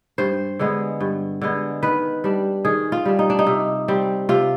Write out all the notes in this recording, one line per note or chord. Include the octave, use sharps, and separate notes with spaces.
G2 C5
D3 G#3 B3
G2
D3 G#3 B3
D#3 B4
G3 D4
D#3 G#4
F4
G3 D4
D#4
D4
D#4
C3
G3 C4
C3 F4